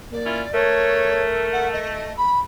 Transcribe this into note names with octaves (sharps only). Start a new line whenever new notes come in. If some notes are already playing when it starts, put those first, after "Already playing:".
A#3 D5
C#4 E4 F4
A3 A#4 C#5
F#5
D#5
B5